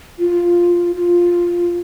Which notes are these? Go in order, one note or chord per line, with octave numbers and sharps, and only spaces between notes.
F4
F4